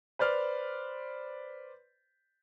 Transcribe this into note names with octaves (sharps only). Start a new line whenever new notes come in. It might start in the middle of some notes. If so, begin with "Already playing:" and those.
B4 C5 D5 F6